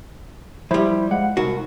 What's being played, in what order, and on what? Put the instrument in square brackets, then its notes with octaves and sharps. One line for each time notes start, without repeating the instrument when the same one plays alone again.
[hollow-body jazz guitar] F3 G3 [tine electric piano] E4 C5
[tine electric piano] G#3 F5 F#5
[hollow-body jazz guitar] C2 F#4 [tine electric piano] D#4 A#4